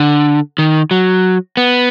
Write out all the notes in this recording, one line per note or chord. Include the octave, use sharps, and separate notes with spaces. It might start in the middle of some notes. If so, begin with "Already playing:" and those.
Already playing: D3
D#3
F#3
B3